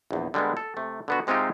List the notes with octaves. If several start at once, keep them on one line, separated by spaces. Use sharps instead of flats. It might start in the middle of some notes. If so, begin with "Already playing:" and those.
A#1 E2
D3 G3 G#3 A#3 B3
A4
C3 A3
D3 B3 F#4
C3 G#3 C4 D#4 F4 G4